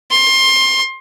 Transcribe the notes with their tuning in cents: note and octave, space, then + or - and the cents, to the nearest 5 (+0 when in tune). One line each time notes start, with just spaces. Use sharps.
C6 +25